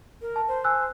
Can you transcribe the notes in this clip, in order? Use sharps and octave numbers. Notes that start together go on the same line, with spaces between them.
A#4
A5
C5
G#5 E6 F#6